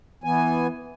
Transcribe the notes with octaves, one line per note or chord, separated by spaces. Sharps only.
E3 B3 G#5